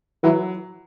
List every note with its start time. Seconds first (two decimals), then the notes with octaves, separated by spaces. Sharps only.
0.23 E3 F#3